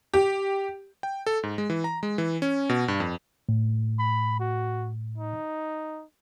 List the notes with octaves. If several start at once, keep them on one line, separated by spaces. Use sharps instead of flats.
G4
G5
A4
G#2
G#3
E3
A#5
G#3
E3
C#4
B2
G2
F2
A2
B5
F#4
D#4